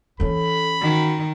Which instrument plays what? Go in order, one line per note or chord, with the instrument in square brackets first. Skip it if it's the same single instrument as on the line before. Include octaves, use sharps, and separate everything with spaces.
[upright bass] E3 C#4 [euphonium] A4 [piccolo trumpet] B5
[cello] D#3 [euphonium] F#4